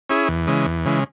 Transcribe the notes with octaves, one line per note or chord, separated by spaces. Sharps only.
C#4 E4 G#4
E2
C#3 E3 G#3
E2
C#3 E3 G#3